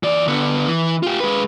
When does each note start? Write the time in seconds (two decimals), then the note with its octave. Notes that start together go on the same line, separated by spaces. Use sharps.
0.03 E3 D5
0.28 D3 B3
0.68 E3
1.03 F4 G4
1.20 G#3 B4